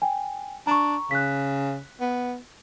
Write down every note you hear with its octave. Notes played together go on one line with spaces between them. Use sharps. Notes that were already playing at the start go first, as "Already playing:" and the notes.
G5 G#5
D4 A#5 C#6
C#3 F#6 B6
B3